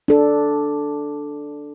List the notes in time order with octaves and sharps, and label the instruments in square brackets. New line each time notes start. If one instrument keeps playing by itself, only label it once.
[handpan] D4 A4